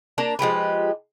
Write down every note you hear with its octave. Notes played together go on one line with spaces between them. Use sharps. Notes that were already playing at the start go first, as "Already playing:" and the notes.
A#3 D4 A5 A#5
F3 G#3 G4 B4